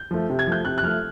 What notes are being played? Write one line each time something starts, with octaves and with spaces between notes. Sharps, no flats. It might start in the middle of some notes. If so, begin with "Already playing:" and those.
Already playing: G6
F3 A3
C3
G#6
F3 A3 G6
C3 F#6
F#6
F3 A3 F6